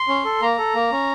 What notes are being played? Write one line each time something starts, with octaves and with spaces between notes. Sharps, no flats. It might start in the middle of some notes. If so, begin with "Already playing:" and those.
Already playing: C6
C#4
A4
A#3 A#5
A4
A#3
C#4